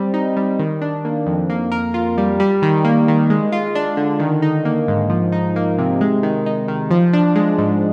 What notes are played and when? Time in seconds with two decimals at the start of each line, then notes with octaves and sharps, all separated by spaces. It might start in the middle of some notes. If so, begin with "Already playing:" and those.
Already playing: G3 C4
0.14 D#4
0.37 G3
0.59 D#3
0.81 D4
1.05 A#3
1.26 F2
1.50 A#3
1.72 A#4
1.94 F4
2.18 G3
2.40 G3
2.62 D#3
2.85 A#3
3.08 D#3
3.30 G#3
3.52 F4
3.75 D4
3.97 D3
4.20 D#3
4.42 D#4
4.65 A#3
4.88 G#2
5.10 F3
5.32 D#4
5.56 A#3
5.79 C3
6.01 G#3
6.23 D#3
6.46 D#4
6.68 D#3
6.91 F3
7.13 D4
7.35 G#3
7.58 G#2